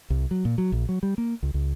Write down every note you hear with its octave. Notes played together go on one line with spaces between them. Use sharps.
C2
F#3
A#2
F#3
A#1
F#3
G3
A#3
C#2
C#2